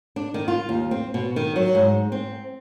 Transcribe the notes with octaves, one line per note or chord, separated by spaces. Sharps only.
D4
D#3
F4
D#2
C4
B2
D#3
F#3
G#2
C4